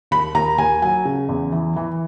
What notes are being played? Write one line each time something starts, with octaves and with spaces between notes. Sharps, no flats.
D#2 B5
D#2 A#5
D#2 G#5
F#3 G#5
C#3
E2
E3
E3